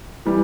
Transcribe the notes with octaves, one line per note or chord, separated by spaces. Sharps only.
E3 G3